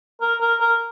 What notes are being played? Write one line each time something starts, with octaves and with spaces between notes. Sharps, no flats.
A#4
A#4
A#4